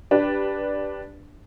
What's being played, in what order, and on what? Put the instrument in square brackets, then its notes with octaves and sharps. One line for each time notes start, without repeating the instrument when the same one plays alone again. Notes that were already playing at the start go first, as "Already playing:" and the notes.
[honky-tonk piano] D4 G4 B4